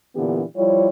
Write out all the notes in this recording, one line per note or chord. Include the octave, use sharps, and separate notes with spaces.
A#2 D3 E3 B3 D4 G4
F3 G3 E4 F4 C#5